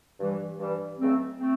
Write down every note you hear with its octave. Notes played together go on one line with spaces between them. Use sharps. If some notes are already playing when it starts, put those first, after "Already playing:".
G2 E3 G3
G2 E3 G3
C#2 C#3 F#3 A3 C4
A3 C4